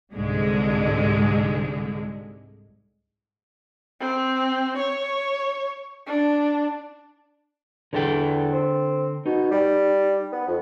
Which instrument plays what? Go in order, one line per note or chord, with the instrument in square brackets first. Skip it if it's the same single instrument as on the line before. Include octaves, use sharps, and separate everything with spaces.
[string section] C2 G#2 D3 G#3
[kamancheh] C4
C#5
D4
[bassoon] E2 [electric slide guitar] D3 A4 G5
[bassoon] C4
[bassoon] B2 [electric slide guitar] D#4
[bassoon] G3
B3
F2